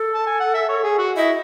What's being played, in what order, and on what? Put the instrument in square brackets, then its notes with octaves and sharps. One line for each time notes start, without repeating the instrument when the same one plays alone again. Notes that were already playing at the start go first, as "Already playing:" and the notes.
Already playing: [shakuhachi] A4
[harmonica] A5
G#5
F#5
E5
C#5
G#4
F#4
[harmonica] E4 [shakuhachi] D#5